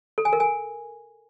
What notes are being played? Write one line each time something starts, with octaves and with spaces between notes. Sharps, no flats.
A4
G#5
A#4
G#5